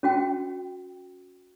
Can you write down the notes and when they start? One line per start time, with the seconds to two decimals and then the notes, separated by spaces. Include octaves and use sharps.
0.03 C#4 F#4 G5